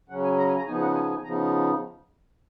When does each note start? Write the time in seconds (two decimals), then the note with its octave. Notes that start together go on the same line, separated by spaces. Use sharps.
0.09 C#3 F#3 C#4 F#5
0.24 G#5
0.38 A#5
0.48 G#5
0.58 A#5
0.67 C#3 F3 B3 D#4 G#5
0.82 F#5
0.95 G#5
1.10 G#5
1.24 C#3 F3 B3 D#4 A#5